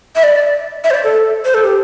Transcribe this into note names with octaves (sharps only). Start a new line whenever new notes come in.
E5
D5
E5
C5
D5
A4
C5
A4
G4